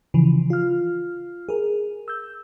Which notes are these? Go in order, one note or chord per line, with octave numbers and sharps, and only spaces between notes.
C#3 E3 F3
F4 F6
G#4 A#4
E6 G6